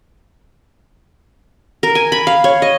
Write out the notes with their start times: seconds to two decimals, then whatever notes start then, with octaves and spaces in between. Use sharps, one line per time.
1.83 A#4
1.95 G#5
2.12 B5
2.27 F5
2.44 C#5
2.62 D#5